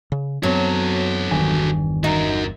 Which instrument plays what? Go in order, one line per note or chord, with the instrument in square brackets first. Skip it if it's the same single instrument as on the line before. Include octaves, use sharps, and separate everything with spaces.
[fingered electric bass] C#3
[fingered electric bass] F#2 B3 C4 [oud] F#3 [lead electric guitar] F#4 A4
[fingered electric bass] G1 E2 G2 [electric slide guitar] D#3 G#5
[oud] D#4 [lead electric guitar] F#4 A#4